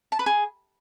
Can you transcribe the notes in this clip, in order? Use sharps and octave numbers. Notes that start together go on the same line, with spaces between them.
A5
B4
G#4